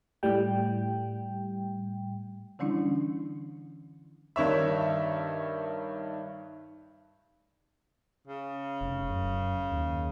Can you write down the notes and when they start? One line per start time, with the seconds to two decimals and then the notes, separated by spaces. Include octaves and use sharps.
0.23 A2 G3 G5
2.59 D3 E3 G3 C#4 D4 E4
4.36 G2 D#3 C#5 E5
8.27 C#3
8.81 F1
9.10 F#2
9.72 D#2